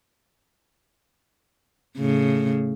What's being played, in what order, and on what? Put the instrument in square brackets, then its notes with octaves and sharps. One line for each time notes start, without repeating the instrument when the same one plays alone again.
[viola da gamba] A2 C#3